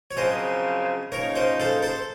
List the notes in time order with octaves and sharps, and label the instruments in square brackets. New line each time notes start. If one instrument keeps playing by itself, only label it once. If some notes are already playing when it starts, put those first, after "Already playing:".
[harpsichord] C#5
[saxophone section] F#2 C#3 F3 C4 [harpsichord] C5 D#5
[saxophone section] C#3 F3 A#3 D#4 [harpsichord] A#4 C#5
[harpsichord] C5 D#5
A4 C5
A4 C5